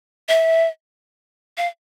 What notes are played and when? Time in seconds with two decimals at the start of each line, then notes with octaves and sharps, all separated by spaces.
0.29 E5
1.57 F5